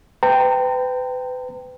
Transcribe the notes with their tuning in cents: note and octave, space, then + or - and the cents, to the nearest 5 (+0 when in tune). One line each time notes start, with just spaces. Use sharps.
B4 +35 G5 +0 A#5 -40